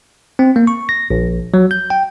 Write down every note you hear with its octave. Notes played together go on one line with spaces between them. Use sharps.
C4
A#3
C#6
A#6
A#1
F#3
G6
G5